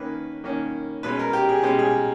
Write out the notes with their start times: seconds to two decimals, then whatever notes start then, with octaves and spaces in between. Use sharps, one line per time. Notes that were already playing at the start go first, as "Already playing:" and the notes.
Already playing: D#3 A#3 C#4 B4
0.44 D#3 A#3 C#4
1.03 B2 G#3 C#4 B4
1.19 A#4
1.33 G4
1.49 G#4
1.63 B2 G#3 C#4 G4
1.79 G#4